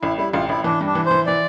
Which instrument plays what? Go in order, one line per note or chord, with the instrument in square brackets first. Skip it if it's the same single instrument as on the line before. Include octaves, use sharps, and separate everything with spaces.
[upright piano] A1 [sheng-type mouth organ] E4
[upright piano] G3 [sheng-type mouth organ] E4
[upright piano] A1 [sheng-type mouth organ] F4
[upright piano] A1 [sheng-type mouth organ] E4
[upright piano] E3 [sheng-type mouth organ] D4
[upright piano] G2
[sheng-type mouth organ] D4
[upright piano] E3
[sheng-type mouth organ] C5
[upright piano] E3
[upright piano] E3 [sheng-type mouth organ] D5